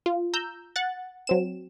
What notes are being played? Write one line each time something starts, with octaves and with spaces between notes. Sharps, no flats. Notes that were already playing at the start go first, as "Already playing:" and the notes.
F4
A#5 E6 G6
F#5 F#6 A6
F#3 C4 E7